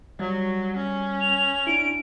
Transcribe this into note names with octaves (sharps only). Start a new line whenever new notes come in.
F#3 G3
C#4
F7
D4 E4 D7